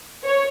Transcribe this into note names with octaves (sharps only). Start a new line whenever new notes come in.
C#5